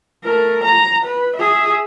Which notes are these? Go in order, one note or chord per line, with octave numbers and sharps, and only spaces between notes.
A3 A#4
A#5
B4
G#4 E5